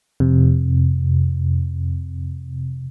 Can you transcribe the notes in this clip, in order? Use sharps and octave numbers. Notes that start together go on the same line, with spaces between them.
F2 C3